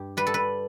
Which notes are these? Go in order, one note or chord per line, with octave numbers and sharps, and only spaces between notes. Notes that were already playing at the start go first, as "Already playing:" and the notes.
Already playing: G2 G4
G3 B4
A4
B4